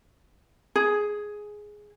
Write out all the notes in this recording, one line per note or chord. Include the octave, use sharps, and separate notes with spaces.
G#4